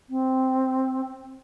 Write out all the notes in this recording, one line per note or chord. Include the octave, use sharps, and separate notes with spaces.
C4